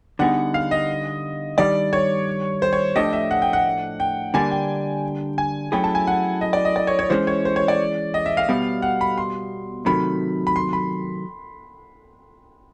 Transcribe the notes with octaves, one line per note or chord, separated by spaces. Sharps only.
D3 G3 B3 D#4 G#4 F#5
F5
D#5
G2 D#3 G3 D5
C#5
C5
C#5
A2 F3 A3 D4 G4 D#5
E5
F#5
G5
F#5
G5
D3 G3 A#3 D4 G#5
G5
G#5
F#3 A3 C#4 E4 G#4 G5
A5
G#5
F#5
D#5
D5
D#5
D5
C#5
C#5
E3 G#3 C#4 C5
C#5
C5
C#5
D5
D#5
E5
F5
B2 G3 B3
F#5
B5
C6
C3 D#3 F#3 A3 B5
B5
C6
B5